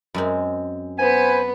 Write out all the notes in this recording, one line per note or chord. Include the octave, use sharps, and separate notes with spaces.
F#2 G#3 C4
B3 B4 C5 G#5